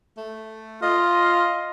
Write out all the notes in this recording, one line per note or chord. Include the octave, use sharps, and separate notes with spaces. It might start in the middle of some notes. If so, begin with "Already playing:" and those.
A3
F4 D#5